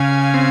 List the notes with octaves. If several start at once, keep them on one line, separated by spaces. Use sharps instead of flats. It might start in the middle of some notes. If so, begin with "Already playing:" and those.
Already playing: C#3 F5 G#5
C4